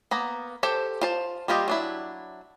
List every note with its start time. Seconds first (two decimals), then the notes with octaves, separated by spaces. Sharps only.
0.11 A#3 B3 A#5
0.63 G4 A4 C5
1.01 F4 C5 A5
1.48 G3 A#3 F4 G4 D#5
1.68 F#3 D4 E4